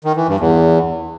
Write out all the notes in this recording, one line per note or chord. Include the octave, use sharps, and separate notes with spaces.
D#3
E3
G2
E2